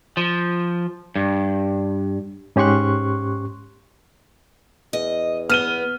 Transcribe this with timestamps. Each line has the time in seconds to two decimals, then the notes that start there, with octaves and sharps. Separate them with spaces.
0.17 F3
1.16 G2
2.56 G#2 C#4 G4 C6 C#6 F#6
4.93 E2 D#5
5.50 B3 F6 D#7 G7